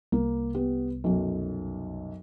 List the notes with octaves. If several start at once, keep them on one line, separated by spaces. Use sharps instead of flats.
C2 A#3
B3 G4
B1 F#2